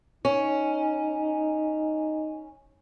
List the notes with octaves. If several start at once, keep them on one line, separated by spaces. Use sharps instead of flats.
C#4 D#4